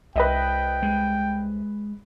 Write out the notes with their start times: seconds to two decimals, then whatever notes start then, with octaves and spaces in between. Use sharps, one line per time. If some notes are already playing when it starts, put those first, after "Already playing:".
0.16 C2 B4 D#5 E5 G5
0.83 G#3